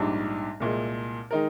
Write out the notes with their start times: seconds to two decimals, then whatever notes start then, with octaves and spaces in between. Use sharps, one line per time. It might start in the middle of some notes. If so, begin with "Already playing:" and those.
Already playing: A#1 G#2 G3 D4
0.60 C2 A#2 G#3
1.31 D#3 G#3 D#4 A#4